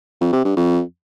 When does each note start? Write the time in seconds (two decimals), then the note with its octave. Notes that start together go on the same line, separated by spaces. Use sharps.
0.21 F2
0.33 C3
0.45 G2
0.57 F2